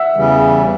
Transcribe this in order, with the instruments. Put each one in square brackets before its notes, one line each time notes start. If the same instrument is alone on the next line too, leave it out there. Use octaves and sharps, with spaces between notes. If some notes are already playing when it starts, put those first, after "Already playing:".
Already playing: [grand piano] E5 F#5 E6
[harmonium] E2 C#3 E3 G3